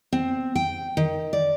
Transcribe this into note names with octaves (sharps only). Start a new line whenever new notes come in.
C4
G5
D#3
D5